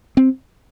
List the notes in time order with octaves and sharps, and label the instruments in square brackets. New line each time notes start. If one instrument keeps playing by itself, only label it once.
[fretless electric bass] C4